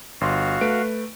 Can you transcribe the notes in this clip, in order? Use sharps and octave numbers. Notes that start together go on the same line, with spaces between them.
G1 F#4 F5 C6
A3 B4 D7